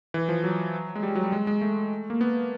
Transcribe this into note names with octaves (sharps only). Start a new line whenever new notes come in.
E3
F3
F#3
G#3
G3
F#3
G3
G#3
G#3
A3
A#3
B3